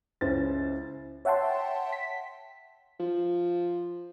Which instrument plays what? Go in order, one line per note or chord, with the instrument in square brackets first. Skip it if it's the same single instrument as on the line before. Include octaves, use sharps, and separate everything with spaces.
[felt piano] C#2 C#4 E4 C5 A6
[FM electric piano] C#5 E5 F#5 G5 A5 C6
B6
[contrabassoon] F3